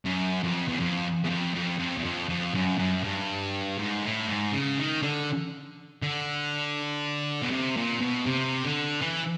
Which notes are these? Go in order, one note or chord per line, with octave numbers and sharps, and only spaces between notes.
F#2
F2
E2
F2
E2
F2
F2
F2
E2
F2
F2
F#2
F#2
G2
G#2
A2
G#2
C#3
D#3
D3
D3
B2
C3
A#2
B2
C3
D3
E3